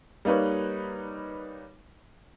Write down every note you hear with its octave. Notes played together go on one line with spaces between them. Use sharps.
G3 A#3 D#4 B4 C#5